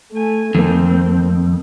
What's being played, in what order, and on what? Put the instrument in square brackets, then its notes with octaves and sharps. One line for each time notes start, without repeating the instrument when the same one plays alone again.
[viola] A3 G#5
[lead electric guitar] F2 [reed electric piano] D#3 A3 A#3 [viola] C4